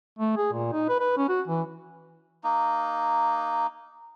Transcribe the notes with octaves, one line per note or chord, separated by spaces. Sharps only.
A3
G#4
A#2
D#4
B4
B4
C#4
F#4
E3
A#3 D#4